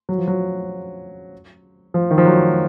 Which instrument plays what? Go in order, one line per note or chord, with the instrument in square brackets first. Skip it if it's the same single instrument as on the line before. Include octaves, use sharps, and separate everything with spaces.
[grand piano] F#3
F3
F#3
F3
D#3
F3
F#3